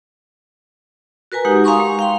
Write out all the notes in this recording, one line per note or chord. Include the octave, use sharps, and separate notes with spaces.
F#4 A#4 B4 G#5 A#5
G#3 D#4 G4 F#5
F5 G#5 A#5 C6 C#6 D#6
G#3
F5 G5 C6